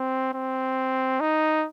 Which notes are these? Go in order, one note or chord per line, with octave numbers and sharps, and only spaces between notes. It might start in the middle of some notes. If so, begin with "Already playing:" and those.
Already playing: C4
C4
D#4